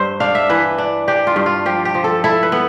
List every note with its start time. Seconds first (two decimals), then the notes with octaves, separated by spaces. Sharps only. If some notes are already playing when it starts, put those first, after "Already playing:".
Already playing: G2 C5
0.20 D4 F5
0.35 E5
0.49 E3 B4
0.78 D4
1.08 D4 G4
1.27 F4
1.36 G2
1.46 F4
1.66 F3 G4
1.85 G4
1.95 F3
2.04 A4
2.24 E4 A4
2.43 B4
2.52 B3